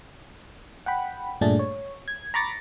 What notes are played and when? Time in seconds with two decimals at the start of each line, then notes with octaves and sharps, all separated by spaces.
0.86 F#5 G5 B5
1.41 G2 A#2 A3 D4 G#4 A6
1.59 C#5
2.08 G#6
2.34 A#5 B5 C#6 D6 A6 A#6